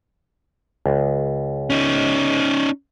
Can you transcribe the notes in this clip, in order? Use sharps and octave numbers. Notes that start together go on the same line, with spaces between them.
C#2
C#4 D#4